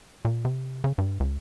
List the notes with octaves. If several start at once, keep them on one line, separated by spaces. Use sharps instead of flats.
A#2
C3
C#3
G2
C#2